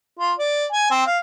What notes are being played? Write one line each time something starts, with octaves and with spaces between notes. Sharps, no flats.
F4
D5
G#5
C4
F5